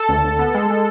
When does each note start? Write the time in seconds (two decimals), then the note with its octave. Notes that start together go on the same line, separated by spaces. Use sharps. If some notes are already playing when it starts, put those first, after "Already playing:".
Already playing: A4
0.09 D2
0.24 D2
0.39 B3
0.54 G#3
0.70 G#3